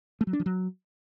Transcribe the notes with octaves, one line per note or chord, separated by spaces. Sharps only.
A3
F#3
D4
F3
F#3